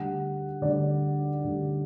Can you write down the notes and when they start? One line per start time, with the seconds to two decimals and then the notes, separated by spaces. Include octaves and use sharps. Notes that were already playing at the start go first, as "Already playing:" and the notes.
Already playing: D2 D3 G3 F#5
0.61 D2 D3 G3 D5
1.44 D2 D3 G3